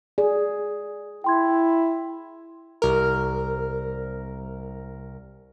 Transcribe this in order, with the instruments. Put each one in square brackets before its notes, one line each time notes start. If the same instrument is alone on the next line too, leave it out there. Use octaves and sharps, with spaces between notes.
[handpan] G#4 [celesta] D5
[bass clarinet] E4 [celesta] G5 C6 G#6
[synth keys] C2 A#4